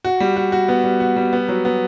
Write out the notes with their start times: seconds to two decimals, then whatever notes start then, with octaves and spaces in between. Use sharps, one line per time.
0.05 F#4
0.20 G3
0.36 F#4
0.52 F#4
0.68 B3
0.84 G3
1.00 F#4
1.16 G3
1.33 B3
1.49 F#3
1.65 B3